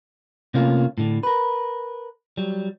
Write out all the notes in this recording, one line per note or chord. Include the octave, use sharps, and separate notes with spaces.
C3 A3 A#3 C#4 F4
A2 D3
A#4 B4
F#3 G3